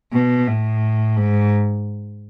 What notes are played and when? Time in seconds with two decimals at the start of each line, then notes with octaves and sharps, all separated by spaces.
0.12 B2
0.48 A2
1.17 G#2